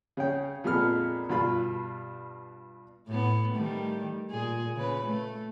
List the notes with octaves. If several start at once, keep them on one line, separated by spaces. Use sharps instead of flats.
C#3 C#4 G5
F2 A#2 G#3 B3 F6
G2 B2 F4 B5
A2 B3
D#3 G3 A3
A#2 G#4
C#3 B4
A3